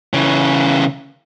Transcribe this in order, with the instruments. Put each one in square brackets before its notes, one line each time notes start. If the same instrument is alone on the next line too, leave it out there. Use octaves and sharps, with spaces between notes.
[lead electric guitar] C#3 E3